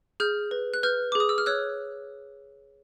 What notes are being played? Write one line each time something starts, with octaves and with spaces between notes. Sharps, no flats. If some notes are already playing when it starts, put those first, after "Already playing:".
G#4 F6 G6
B4
F#6
B4 F6 G6
G#4 D6
D#6
E6
F6
C#5 E6 F#6